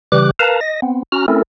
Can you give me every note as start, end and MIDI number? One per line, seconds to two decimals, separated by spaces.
0.12 0.31 49
0.12 0.31 52
0.12 0.31 55
0.12 0.31 67
0.12 0.31 86
0.12 0.31 90
0.39 0.60 70
0.39 0.60 71
0.39 0.60 77
0.39 0.60 81
0.39 0.60 82
0.61 0.80 75
0.61 0.80 94
0.82 1.03 59
0.82 1.03 60
1.12 1.26 61
1.12 1.26 66
1.12 1.26 82
1.12 1.26 89
1.28 1.42 57
1.28 1.42 60
1.28 1.42 61
1.28 1.42 64
1.28 1.42 69
1.28 1.42 70